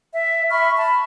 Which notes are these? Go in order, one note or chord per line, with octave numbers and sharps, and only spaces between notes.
E5
E5 B5 C#6 F6
A5 B5